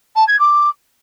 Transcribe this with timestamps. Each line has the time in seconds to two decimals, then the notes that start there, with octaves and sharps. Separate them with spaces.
0.16 A5
0.28 G#6
0.39 D6